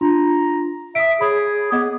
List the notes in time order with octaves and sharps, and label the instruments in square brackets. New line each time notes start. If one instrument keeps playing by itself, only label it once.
[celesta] D4 F4 C6 [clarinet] A#5
[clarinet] E5 [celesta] D#6 D7
[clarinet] G#4 [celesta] C#5 B5
[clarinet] B3 [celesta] D#5 D6 G#6